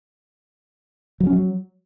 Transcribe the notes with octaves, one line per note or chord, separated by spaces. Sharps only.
F#3
C#4
F#3